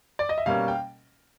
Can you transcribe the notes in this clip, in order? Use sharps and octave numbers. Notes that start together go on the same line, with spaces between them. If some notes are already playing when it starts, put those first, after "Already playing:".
D5
D#5
E5
B2 G3 A#3 C#4 F5
G5